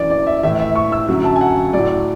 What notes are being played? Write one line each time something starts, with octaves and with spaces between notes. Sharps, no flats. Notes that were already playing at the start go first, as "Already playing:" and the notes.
Already playing: F#2 E3 D5
D5
E5
A2 E3 E5
E5
C#6
E6
F#2 D3 F#3
A5
G#5
F#5
A2 F#3 D5